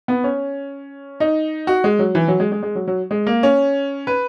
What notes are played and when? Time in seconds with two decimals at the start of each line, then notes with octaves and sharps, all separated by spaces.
0.08 B3
0.24 C#4
1.20 D#4
1.67 F#4
1.84 G#3
1.99 F#3
2.15 E3
2.28 F#3
2.40 G#3
2.52 G#3
2.63 G#3
2.75 F#3
2.87 F#3
3.11 G#3
3.27 A#3
3.43 C#4
4.07 B4